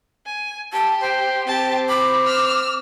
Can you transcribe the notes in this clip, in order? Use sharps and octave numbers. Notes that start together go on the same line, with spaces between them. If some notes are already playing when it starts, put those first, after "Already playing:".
G#5
G4 A5
C5 G5
C4 G4 A5
B5 D6
E6 F6